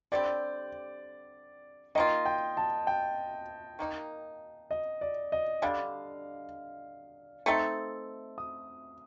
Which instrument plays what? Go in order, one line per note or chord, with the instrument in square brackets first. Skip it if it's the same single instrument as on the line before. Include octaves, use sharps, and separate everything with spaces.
[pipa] D3 G3 C4 G4 [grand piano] D5
[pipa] D#3 A#3 F4 [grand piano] D#5
[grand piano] G5
A5
G5
[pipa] D#3 A#3 D#4
[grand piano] D#5
D5
D#5
[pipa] D3 G3 D4 [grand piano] F5
[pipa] A3 C4 D#4 A4
[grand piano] D#6